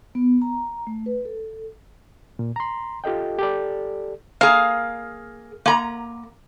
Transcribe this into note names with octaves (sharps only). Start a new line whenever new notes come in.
B3
A#5
A3
B4
A4
A#2
A#5 C6
F4 G4 A4 D#5 G5
G4 A4 D5
A#3 G#4 F5
A#3 A#5